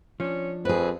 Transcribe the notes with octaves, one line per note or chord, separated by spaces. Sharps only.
F3 C#4 D4
F2 C4 G#4 B4